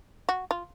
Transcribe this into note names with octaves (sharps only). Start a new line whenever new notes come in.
F#4
F4